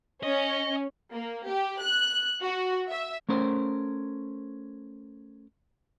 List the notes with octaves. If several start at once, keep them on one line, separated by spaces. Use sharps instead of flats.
C#4 D#5
A#3
G4
F#6
F#4
E5
A3 C#4 A#4 C5